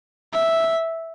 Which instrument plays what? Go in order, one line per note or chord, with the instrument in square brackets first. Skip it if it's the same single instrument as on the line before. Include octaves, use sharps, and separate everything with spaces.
[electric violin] E5